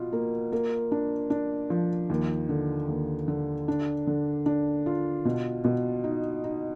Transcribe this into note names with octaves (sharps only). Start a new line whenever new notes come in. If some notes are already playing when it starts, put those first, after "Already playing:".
Already playing: B2 F4
A#3
A#3
D4
D4
F3
D#2
D3
D#2
D3
D4
D3
D4
F4
B2
B2
D#4
D#4